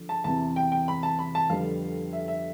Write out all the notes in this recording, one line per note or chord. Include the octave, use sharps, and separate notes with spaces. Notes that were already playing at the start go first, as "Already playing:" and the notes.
Already playing: D3 F3
A5
E2 C3 E3 A5
G5
G5
B5
A5
B5
A5
F2 D3 G3 B3 F5
E5
E5